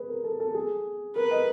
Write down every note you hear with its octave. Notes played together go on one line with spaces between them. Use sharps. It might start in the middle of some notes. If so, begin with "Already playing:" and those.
Already playing: G#4 B4
A#4
A4
A4
G#4
A#4 B4
D#5